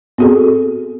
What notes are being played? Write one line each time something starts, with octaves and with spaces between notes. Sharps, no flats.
B3 C4 F#4 G#4 A4